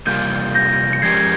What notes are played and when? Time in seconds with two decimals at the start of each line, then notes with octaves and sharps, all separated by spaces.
0.07 C3 G3 A#3 F4 G6
0.55 G6 A#6
0.93 C#7
1.02 F3 G#3 C#4 G4 A#4 G#6 C7